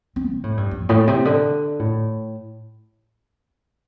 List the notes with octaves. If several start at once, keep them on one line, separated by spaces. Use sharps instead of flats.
C4
C3
A2
G2
F2
A2
C3
D3
A2